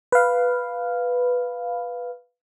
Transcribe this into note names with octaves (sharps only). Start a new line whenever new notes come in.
B4 F5